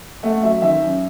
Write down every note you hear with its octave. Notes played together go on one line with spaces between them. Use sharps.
A3 F#5
F#3 E5
D#3 E5
F#2